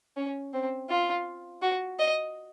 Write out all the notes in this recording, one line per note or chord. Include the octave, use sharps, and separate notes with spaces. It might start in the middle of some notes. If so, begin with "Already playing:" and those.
C#4
C4
F4
F#4
D#5